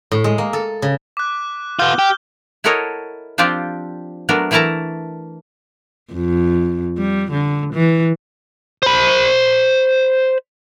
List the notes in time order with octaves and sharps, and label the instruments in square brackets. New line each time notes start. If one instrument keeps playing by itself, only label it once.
[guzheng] A2
G#3
A#3
A4
C#3
[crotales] D6 F#6
[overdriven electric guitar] B3 F4 [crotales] F6 G6 G7
[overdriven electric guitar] G4
[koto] E4 F#4 A4 A#4 C#5 D#5
F3 C4 D4 F4 G4 D5
F#3 A3 B3 D4 A#4
E3 A3 E4 A#4 A5 A#5
[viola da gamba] F2
G3
D3
E3
[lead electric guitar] C5 B5